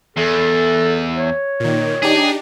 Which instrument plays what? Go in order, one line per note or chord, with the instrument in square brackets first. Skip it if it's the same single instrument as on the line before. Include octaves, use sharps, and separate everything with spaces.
[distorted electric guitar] E2 [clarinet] A4
[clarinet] C#5
[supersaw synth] A#2 D#3
[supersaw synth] D4 D#4 G4 [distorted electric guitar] G#4